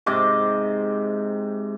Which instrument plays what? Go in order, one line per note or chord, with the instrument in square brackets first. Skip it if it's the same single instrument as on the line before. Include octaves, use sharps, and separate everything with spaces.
[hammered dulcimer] G#2 C3 D#5 D6